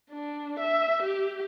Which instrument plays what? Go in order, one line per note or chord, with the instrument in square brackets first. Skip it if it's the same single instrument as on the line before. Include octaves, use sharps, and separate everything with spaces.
[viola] D4
E5
G4